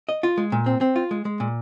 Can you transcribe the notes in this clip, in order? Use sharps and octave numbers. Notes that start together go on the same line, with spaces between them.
D#5
F4
G#3
A#2
C4
C4
F4
G#3
G#3
A#2